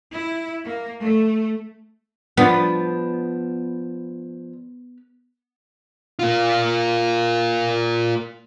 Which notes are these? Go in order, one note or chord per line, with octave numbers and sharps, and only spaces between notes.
E4
A#3
A3
F3 B3 D4
A#3 F4